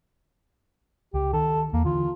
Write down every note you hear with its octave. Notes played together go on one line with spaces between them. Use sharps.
C#2 G4
D#3 A4
E2 A#3
D3 E3 F4